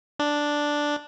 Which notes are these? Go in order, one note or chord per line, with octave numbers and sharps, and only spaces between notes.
D4